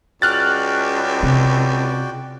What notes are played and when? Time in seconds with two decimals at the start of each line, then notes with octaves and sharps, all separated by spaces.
0.22 C#2 F#4 D5 G5 F6 F#6 A6
1.23 C3